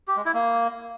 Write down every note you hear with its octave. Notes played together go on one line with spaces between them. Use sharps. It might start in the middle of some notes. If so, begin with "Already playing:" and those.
G4
G#3
E4
A#3